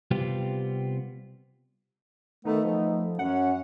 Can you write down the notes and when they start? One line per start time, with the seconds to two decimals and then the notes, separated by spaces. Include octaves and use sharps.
0.11 C3 G3 B3 C4 F4 G4
2.45 D#3 A3 B3 D#4
2.65 F3 A3
3.19 F#2 C#4 F#5